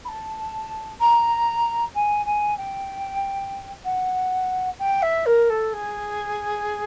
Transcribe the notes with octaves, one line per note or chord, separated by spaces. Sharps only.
B5
A5
A#5
G#5
G#5
G5
F#5
G5
E5
A#4
A4
G#4